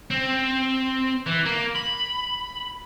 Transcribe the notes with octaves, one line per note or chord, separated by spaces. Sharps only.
C4
E3
A#3
B5